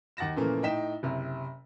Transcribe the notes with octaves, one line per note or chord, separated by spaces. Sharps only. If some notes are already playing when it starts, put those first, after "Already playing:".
D#2 F#5 A6 A#6 E7
A#2 C#3 E3 F3 A3 A#3
A2 D#4 G5 B6 E7
F#1 C3